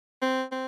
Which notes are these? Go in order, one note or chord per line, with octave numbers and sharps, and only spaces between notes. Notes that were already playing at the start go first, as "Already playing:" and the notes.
C4
C4